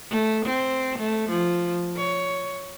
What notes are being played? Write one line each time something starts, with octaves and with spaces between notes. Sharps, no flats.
A3
C4
A3
F3
C#5